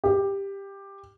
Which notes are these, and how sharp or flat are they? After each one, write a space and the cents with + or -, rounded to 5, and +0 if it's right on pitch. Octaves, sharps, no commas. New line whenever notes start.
G4 +10